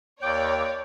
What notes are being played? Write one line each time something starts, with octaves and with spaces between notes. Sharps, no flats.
D#2 C#5 D5 G5 D6